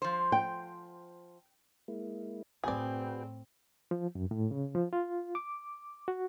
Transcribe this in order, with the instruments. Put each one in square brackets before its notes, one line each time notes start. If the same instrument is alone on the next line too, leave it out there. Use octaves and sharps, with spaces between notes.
[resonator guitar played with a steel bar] F3 C5
[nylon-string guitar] G5
[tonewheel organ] G#3 A#3 E4
[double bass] A2 C4 [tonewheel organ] F#4 B4 G5 [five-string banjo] G#4 D5
[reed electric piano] F3
F#2
A2
C#3
F3
F4
D6
F#4